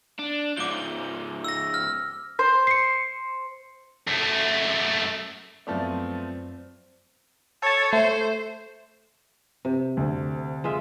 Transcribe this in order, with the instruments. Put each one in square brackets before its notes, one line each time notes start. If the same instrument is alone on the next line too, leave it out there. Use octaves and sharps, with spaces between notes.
[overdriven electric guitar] D4
[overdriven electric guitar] G#2 F3 [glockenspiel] D6 G7
[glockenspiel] E6 A#6
F6
[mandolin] C5
[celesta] C7 C#7
[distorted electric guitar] F#2 A3
[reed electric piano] F#2 D5 [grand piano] F3 A3 B3 [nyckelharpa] C4
[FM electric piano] A4 A5 [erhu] C#5
[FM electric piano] A3 [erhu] C5
[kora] C3
[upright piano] D2
[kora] G#3 F4 E5